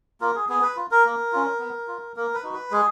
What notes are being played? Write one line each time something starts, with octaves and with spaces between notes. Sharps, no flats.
A#3 F4 A#4
G#4
B3 G#4
B4
F4
A#4
A#3
C#4 F4
B3
F4
A#3 A#4
B4
D#4 F#4
B4
G#3 G#4